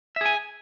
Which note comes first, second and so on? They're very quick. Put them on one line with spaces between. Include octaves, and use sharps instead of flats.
E5 G#4 G#5